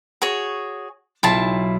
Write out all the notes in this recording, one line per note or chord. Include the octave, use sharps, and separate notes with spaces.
F#4 G#4 C#5
B1 E4 F4 A5